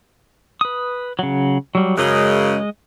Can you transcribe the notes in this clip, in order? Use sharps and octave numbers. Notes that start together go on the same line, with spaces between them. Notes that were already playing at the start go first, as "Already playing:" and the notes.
B4 D#6
C#3 F#3
F#3 G3
F#2 C#3 G#3 D#5